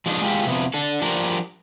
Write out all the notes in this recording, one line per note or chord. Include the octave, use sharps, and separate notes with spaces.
F3 G#3 D4 D#4
G#3 F4 G4 A4
C3 F3 B3
D4 A4
F3 G3 D4 A#4